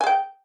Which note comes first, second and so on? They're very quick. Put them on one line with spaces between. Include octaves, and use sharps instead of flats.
G#5 G#4 G5